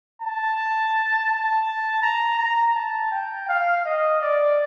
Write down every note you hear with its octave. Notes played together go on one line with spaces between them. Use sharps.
A5
A5
A#5
A#5
A5
G5
F5
D#5
D5